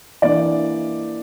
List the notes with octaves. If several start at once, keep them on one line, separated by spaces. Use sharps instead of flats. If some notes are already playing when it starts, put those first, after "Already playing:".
E3 A#3 D4 D5